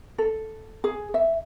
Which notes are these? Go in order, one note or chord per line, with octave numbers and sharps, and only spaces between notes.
A4
G#4
E5